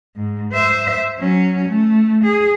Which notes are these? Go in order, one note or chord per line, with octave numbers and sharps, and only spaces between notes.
G#2
C5 E5
F#3 C#4
A3
G#4